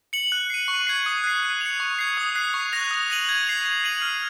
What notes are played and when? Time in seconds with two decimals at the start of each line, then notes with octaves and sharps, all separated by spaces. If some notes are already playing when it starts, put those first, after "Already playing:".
0.13 C#7 F#7
0.32 F#6
0.50 C7 D#7
0.68 C#6
0.87 G#6 C7
1.06 D#6
1.24 F#6 C7
1.43 F#6
1.61 C#7 F7
1.80 C#6
1.99 G#6 C7
2.17 D#6
2.36 F#6 C7
2.54 C#6
2.73 F#6 A#6 F7
2.91 D#6
3.10 A#6 D#7 F#7
3.29 G#6
3.47 C7 F7
3.66 G#6
3.84 C7 D#7 F#7
4.02 F6